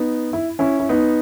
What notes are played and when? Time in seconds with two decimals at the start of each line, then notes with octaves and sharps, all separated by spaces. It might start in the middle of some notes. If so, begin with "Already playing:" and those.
Already playing: B3 D#4
0.33 E4
0.59 C#4 E4
0.79 E4
0.89 B3 D#4